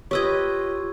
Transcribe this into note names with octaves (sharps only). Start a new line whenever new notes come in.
F4 G4 B4 C#5 D#5 C#6 E6 G#6